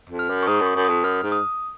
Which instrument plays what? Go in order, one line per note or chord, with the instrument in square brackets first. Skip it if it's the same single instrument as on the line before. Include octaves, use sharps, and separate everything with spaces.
[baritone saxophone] F2
[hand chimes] F6
[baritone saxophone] F#2
[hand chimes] C#6
[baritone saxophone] G#2 [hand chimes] D#6
[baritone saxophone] F#2
[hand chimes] C#6
[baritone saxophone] F#2
[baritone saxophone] F2 [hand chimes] D#6
[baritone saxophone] F#2 [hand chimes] F6
[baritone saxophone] G#2
[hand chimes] D#6